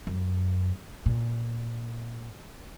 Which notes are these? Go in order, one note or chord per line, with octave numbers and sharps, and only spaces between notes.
F#2
A#2